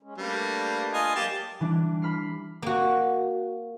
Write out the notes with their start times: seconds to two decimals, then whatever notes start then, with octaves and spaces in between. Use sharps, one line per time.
0.03 G#3 C#4
0.18 G3 A3 A#3 D4 B4
0.93 F4 D#5 G#5
1.16 F#3 G#3 A#3 G4 A5
1.60 E3 G3 D4
2.02 B5 F6 C7
2.62 A#3 F#4